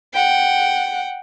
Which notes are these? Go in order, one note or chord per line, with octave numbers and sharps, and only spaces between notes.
F#5 G5